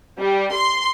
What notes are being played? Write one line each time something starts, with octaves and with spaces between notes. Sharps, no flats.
G3
C6